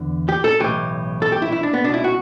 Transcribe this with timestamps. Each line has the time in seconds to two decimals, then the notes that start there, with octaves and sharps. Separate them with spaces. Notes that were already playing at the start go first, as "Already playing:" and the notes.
Already playing: E2 D3
0.29 G4
0.44 A4
0.59 B1 A2 E3 G4
1.22 A4
1.32 G4
1.42 E4
1.52 E4
1.63 D4
1.73 B3
1.84 C#2 B2 D4
1.94 E4
2.04 F#4